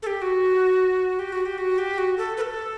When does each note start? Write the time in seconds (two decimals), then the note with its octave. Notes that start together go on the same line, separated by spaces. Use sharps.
0.02 A4
0.07 G4
0.22 F#4
1.19 G4
1.33 F#4
1.45 G4
1.58 F#4
1.78 G4
1.98 F#4
2.18 A4
2.37 B4
2.41 A4